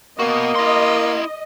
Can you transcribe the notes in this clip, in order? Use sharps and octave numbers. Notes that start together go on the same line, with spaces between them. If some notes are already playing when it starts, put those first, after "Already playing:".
A#3 B3 F#4 D#5
E4 C6